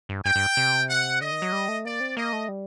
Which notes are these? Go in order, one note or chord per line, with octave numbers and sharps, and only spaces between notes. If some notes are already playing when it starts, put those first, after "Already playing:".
G2
G2 G5
G2
C3
F#5
D3 D#5
D#3
F#3
G3
A3
A#3 D5
C4
A#3 D#5
A3
G3